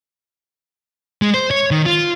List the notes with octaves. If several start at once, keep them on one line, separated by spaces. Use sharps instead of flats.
G#3
C5
C#5
D#3
F4